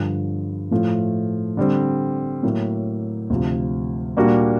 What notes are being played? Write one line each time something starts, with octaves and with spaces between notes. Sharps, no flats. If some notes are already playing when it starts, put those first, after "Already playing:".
Already playing: G2 D3 F3
A2 F3 A3
D3 G3 C4
A2 F#3 A#3
D2 C3 F3
A#2 G3 A#3 D4 F#4